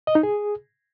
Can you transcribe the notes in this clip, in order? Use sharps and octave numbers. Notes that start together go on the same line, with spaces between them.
D#5
D#4
G#4